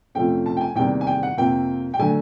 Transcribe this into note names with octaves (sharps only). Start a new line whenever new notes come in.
F2 C3 F3 A3 C#4 G5
A5
G5
G#5
E2 C3 D#3 G3 A#3 G5
G#5
G5
F#5
F2 C3 F3 A#3 G5
G5
D3 F#3 A3 G#5